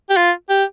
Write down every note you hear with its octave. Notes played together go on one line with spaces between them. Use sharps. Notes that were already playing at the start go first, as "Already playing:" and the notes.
G4
F4
G4